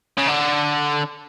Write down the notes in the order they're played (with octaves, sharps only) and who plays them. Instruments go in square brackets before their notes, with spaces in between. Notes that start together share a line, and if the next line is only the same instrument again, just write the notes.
[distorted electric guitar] C#3
D3